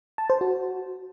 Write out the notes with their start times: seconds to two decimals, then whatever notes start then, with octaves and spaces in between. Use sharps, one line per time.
0.18 A5
0.30 C5
0.41 F#4